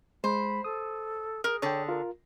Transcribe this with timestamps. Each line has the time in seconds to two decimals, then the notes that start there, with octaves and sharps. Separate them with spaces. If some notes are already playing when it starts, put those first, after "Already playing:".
0.24 G#3 C5 B5
0.64 A4 D#6
1.44 G#4 A#4
1.62 D3 C#5 G5 A5
1.89 F4 A#4